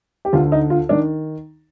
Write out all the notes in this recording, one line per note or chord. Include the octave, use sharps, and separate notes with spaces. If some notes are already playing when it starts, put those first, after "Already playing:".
G4
D2 D3 F4
D#4
F4
D#3 D4